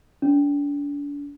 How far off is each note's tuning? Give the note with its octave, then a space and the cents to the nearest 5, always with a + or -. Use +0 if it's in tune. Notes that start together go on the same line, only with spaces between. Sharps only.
D4 -40